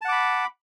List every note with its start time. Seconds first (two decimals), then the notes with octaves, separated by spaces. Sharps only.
0.01 A5
0.05 F#5
0.08 D6
0.12 B5